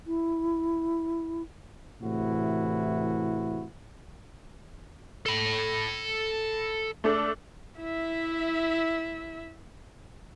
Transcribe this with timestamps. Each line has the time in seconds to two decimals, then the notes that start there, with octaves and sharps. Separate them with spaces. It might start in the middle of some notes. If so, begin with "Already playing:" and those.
0.07 E4
2.02 A2 C3 E3 E4 F#4
5.26 A4 B5
7.04 A3 D4 A4
7.81 E4 E5